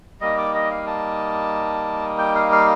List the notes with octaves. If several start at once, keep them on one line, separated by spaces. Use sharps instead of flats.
G3 A#3 D#4 D#5
D5
D#5
F5
A5
G5
F5
F5